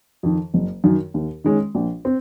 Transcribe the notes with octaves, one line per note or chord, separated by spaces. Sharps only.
F2 D#3
F#1
F#2 D#3
D#2
D#3 G#3 C#4
A#1
C4